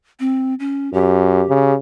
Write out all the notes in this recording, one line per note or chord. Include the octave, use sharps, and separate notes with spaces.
C4
C#4
F#2 G4
C#3